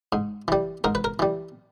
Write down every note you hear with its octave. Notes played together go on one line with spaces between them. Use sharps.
G#2
E3 G3
G#2 A#4
B4
A#4
E3 G3